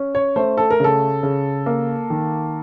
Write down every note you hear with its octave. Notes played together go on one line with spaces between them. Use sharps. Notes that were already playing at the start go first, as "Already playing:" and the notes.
Already playing: C#4
C#5
A3 C5
A4
A#4
C#3 A4
C#3
A#3
D#3